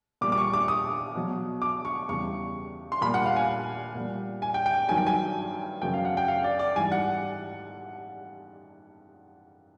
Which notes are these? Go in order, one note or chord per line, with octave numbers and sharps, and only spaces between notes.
A#2 G3 D6
D6
C#6
D6
D#6
B2 F#3
D6
C#6
E2 C#3 E3 G3 C#6
C6
A#2 G3 B5
F#5
F5
G#5
A#2
G3
G#5
G5
G5
G2 D#3 F#3 G#5
G5
G#5
F#2 C#3 F#3 G5
F5
F#5
G5
F5
D5
D5
G#2 E3 G3 G#5
F#5